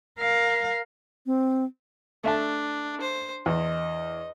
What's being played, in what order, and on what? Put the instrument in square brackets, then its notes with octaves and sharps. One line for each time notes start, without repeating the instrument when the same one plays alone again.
[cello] A#4 F5
[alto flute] C4
[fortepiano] A3 E5 A5 [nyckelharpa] D4
[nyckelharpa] C5
[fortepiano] E2 [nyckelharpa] D#5